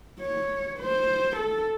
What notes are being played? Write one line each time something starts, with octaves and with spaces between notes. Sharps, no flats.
C#5
C5
A4